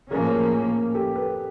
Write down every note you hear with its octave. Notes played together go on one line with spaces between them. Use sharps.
A2 F3 A#3 C#4 G#4 A#4
G4 A4
A4 B4